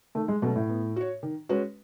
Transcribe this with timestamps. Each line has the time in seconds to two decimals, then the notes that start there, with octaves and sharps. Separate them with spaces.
0.15 D#3 A3
0.28 G#3
0.42 B2 F#3 A3 C#4
0.55 A2
0.69 B3
0.96 F#4 C#5
1.23 D#3
1.49 G#3 C#4 F#4 B4